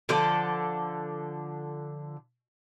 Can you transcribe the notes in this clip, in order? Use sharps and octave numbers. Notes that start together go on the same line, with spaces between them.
D3 F3 A4 D5